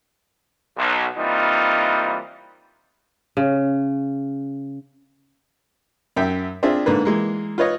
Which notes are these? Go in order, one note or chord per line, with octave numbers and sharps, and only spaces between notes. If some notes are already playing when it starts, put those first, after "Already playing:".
B1
E3 G3 A#3 C4 D#4 F4
C#3
F#2 E5 G5
C4 D4 F4 G#4 E5
G#2 D3 A#3 B4
E3 G#3 A#3
F4 B4 C#5 D#5